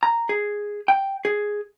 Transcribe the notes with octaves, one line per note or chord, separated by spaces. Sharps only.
A#5
G#4
G5
G#4